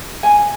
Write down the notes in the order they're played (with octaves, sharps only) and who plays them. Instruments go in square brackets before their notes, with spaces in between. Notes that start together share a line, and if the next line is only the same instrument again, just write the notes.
[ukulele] G#5